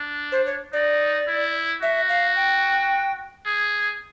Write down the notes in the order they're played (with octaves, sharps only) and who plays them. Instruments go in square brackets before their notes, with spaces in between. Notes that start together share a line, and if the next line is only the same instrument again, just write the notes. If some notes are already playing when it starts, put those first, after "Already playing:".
Already playing: [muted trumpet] D4
[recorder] C5
C#5
[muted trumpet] D#4 [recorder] D5
[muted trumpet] E4
[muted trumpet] F#4 [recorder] E5
[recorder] F5
G5
[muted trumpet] G#4